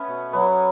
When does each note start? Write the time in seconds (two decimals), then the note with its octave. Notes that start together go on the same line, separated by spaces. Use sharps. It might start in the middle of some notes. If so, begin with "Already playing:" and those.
Already playing: A3 B3 C#4
0.08 B2
0.33 F#3 B3